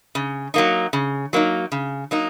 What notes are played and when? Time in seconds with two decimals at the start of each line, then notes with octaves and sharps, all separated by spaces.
0.15 C#3
0.54 F#3 A#3 D#4
0.93 C#3
1.33 F#3 A#3 D#4
1.72 C#3
2.11 F#3 A#3 D#4